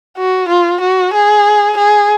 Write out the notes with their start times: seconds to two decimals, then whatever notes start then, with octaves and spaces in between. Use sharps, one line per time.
0.17 F#4
0.49 F4
0.81 F#4
1.13 G#4
1.77 G#4